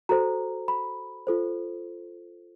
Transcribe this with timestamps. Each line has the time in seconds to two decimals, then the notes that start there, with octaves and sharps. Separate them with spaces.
0.09 F#4 A4 C5 A#5
0.68 B5
1.27 F4 A4 C5